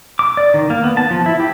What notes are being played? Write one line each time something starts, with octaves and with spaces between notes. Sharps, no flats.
D6
D5
D#3
A#3
B3
A5
F3
E4
G4